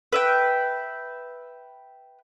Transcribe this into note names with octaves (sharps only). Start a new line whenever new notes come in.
B4 E5 G5